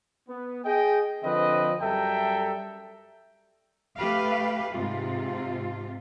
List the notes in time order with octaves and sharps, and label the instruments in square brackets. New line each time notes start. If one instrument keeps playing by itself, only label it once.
[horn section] B3
G#4 D#5 G5
D3 F3 C4 B4 D#5
F#2 G3 A4 E5 G5 A#5
[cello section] A3 G4 B4 F5
G#2 C3 F4